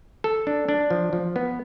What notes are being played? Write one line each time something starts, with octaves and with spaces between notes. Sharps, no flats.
A4
D4
D4
F3
F3
B3